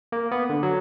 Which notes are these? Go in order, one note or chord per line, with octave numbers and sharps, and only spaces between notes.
A#3
B3
D3
F#3